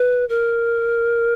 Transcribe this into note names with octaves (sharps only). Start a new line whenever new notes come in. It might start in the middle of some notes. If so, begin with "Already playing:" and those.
Already playing: B4
A#4